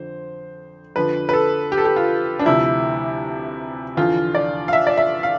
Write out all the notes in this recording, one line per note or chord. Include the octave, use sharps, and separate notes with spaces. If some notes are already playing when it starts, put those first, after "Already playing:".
Already playing: F2 D3 C5
F2 D3 F3 B4
B4
A4
G4
A4
G4
F4
D4
D2 C3 F3 E4
E2 D3 F3 F4
D5
F5
E5
D5
E5
F5